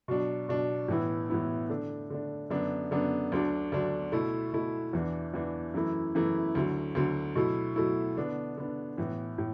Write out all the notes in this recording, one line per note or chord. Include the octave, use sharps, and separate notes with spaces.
B2 F#3 D4
B2 F#3 D4
A2 E3 B3 E4
A2 E3 B3 E4
D3 A3 D4
D3 A3 D4
F#2 D3 B3 D4
F#2 D3 B3 D4
D2 D3 F#3 D4
D2 D3 F#3 D4
B2 A3 E4
B2 A3 E4
E2 E3 D4
E2 E3 D4
F#2 E3 A3 E4
F#2 E3 A3 E4
D2 D3 F#3
D2 D3 F#3
B2 F#3 A3 E4
B2 F#3 A3 E4
D3 B3 D4
D3 B3 D4
A2 E3 B3
A2